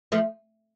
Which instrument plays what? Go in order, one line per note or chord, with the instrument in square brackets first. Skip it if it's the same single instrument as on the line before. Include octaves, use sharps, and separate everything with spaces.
[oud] F3 A3